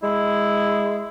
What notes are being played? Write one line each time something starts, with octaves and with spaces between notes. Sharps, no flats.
G#3 E4